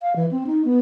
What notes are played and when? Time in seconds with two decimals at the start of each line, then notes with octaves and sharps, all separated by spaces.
0.02 F5
0.16 E3
0.31 C4
0.47 D#4
0.65 B3